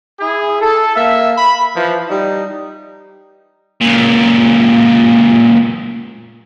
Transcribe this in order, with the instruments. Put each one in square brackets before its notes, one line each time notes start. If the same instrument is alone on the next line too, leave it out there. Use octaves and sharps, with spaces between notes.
[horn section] E4 G#4
A4
A#3 E5
B5
E3 F3
G3 D#4
[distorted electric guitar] C#2 A#2